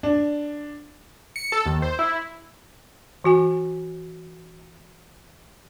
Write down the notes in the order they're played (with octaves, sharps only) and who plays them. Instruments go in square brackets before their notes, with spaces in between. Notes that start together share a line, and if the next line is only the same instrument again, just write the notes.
[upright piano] D4
[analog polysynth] C#7
A4
D#2
C5
E4
[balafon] E3 F#4 G#5